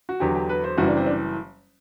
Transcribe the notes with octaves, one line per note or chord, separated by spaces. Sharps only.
F#4
E2 D3 F#3 G4
G4
B4
C5
F#1 F#2 E3 G3 F#4
D4
C4
D4